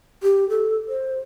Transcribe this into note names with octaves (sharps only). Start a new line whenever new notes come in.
G4
A4
C5